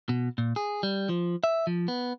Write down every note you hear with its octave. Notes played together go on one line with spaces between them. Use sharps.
B2
A#2
G#4
G3
F3
E5
F3
B3